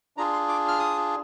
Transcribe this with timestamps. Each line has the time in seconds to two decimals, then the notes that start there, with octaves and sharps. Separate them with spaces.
0.17 D4 F4 G#4 A#5
0.33 C6
0.48 D6
0.68 F6
0.79 D#6